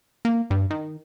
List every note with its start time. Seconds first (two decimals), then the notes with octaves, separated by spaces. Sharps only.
0.25 A#3
0.51 G2
0.70 D#3